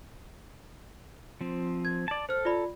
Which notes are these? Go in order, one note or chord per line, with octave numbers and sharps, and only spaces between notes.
F3 C4
G#6
D5 A5
A4 C5 F6
F4 D5 B5